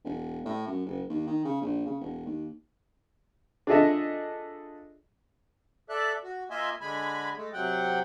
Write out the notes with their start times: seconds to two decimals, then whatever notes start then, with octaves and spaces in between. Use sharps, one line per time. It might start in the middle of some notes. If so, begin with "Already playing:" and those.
0.04 E1
0.45 A2
0.67 F#2
0.86 F#1
1.09 D#2
1.27 D#3
1.44 C#3
1.61 A#1
1.86 C#3
2.01 E1
2.26 D#2
3.67 D4 F4 G#4 A4 D#5 E5
5.89 A4 D5 E5 F#6
6.24 F#4
6.50 A#3 F4 D#5 E5 G#5
6.81 D3 G#3 G#5 B5
7.36 G#3 A3
7.53 C3 F#3 F#5 G5